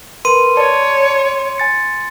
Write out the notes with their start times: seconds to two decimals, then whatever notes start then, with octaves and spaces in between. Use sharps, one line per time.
0.25 A#4 B4 C6 D#7
0.57 C#5 D5 A5
1.58 G#5 A6 C#7